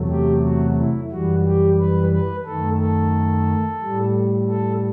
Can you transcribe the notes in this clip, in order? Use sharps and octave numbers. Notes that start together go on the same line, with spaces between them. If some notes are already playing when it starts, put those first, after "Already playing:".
Already playing: E2 C3 F#3 A3
G4
F#4
E4
F#2 E3 G3 F#4
G4
B4
B4
F#2 D#3 A3 A4
A4
A2 G3
A4